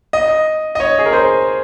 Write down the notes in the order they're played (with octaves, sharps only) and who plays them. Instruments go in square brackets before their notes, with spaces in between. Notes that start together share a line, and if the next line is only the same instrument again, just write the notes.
[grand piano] D#5
D#5
C#5
G#4
A#4
C5